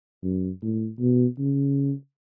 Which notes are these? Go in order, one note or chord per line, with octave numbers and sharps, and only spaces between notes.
F#2
A2
B2
C#3